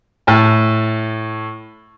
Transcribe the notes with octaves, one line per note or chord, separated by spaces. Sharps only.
A2 A5